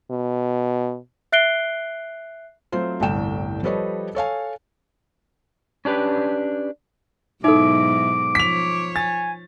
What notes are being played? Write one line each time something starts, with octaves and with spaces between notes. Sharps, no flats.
B2
E5 F#6 C7 D7 G7
F#3 A3 C4 F4 C5
G1 C2 A2 G5 E7
F3 G3 A4 B4 C#5 D#5
A4 C#5 F5 G#5
C#4 D4 G4 B4
G#2 B2 F#3 D#4 E4 A4 D6
F3 C#5 B6 F7
G#5 A6